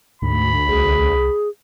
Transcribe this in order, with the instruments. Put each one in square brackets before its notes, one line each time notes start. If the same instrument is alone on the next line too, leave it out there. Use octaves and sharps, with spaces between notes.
[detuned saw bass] D2 [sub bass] G#2 [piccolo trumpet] B5
[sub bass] C2 [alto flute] G#4